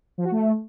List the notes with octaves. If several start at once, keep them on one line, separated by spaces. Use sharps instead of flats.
F3
F#4
A3